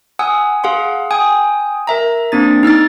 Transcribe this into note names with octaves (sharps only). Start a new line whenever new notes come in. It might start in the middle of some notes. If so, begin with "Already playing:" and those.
F#5 G#5 D#6 E6
G#4 F5 F#5 C6
G5 G#5 D#6
A#4 E5 A#5
A#3 C4 D4 A6
D#4 E6 F6 A6